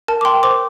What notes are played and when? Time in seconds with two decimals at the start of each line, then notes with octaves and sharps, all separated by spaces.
0.08 A#4 A5
0.21 D6
0.25 G5 C6
0.43 C5 D6